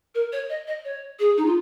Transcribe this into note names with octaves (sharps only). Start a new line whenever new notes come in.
A#4
C#5
D#5
D#5
C#5
G#4
D#4
F4